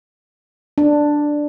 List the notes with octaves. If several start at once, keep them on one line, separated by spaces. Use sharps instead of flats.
D4